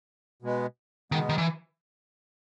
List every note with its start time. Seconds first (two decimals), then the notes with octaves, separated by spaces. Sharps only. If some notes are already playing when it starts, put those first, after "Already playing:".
0.42 B2 G#3 B3
1.12 B2 D#3 G#3 B3
1.29 D#3
1.38 E3